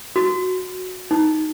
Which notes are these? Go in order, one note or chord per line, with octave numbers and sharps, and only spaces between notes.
F#4
D#4